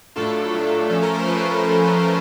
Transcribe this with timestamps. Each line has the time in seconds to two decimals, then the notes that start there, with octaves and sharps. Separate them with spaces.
0.16 A2 F#3 A3 D4 F4 A4
0.52 A2 F#3 A3 D4 F4 A4
0.90 F3 A3 C#4 A4
1.02 A#4
1.15 C5
1.27 F3 A3 C#4 B4